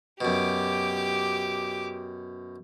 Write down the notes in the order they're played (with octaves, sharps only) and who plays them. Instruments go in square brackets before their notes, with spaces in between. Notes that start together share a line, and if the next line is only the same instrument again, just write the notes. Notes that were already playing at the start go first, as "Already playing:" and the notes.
[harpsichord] F#2 B2 [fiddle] G4 D6